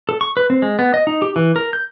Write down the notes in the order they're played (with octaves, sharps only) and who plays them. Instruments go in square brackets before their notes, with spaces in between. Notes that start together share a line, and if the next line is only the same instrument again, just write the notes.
[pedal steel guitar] A4
C#6
B4
C4
G#3
B3
D#5
D#4
G4
E3
A#4
G6